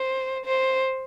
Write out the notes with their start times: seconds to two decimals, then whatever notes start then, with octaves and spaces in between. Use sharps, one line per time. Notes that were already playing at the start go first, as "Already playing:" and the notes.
Already playing: C5
0.45 C5